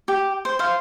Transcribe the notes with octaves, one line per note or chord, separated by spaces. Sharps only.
G4
C5
C5 F5